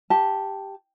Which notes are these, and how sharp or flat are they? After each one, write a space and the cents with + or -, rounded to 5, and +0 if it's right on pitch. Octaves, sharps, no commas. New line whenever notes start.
G4 +0 A5 +0